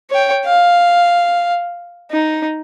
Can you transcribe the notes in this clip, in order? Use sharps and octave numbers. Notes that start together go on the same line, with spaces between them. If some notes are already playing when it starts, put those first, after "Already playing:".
C#5 G5
F5
D#4